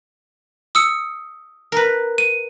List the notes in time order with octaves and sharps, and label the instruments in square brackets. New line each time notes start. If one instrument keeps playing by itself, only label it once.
[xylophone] D#6 E6 C#7
[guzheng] A#4 B4
[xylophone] D#7